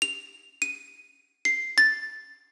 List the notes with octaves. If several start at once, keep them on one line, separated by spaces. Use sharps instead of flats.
F7
D#7
C7
A6